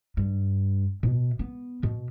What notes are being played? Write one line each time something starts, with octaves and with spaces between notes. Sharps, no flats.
G2
B2
B3
B2